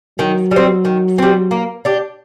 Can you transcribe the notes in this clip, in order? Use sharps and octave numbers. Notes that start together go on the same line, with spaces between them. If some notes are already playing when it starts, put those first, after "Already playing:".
D#3 F#3
G3 C4
D#3
G3 C4
A#3
D4 G4